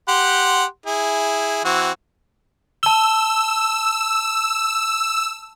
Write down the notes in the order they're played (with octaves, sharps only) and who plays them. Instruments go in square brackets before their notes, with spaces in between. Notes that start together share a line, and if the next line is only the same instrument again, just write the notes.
[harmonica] G4 F#5 C6
E4 G#4
E3 C4 F#4
[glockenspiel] A5 G7 [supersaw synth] E6